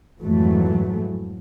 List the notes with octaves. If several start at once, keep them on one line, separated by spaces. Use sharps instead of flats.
F2 G#2 E3 F#3 A3